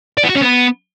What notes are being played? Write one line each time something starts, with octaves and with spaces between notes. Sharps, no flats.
D5
B3
F#4
C#4
B3